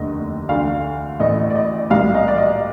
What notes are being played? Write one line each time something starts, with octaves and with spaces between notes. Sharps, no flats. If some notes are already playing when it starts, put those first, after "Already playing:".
Already playing: F1 D#2 D3 A3 D#5
D2 D3 A3 F5
A1 A2 A3 D#5
D5
D#5
C2 A#2 G3 F5
D#5
D5
D#5